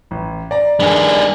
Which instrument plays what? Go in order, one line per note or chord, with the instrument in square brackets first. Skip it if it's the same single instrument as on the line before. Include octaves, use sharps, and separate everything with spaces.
[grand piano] A1
D5 A#5
[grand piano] G2 D#3 [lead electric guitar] G3 G#4